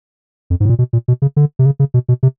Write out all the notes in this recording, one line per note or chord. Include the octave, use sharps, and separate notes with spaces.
F2
G#2
A2
A#2
B2
A#2
B2
C#3
D3
C3
C#3
C#3
B2
B2
C3